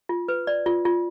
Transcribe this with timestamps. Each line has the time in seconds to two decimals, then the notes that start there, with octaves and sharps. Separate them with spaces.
0.09 F4
0.28 B4
0.47 D5
0.66 F4
0.85 F4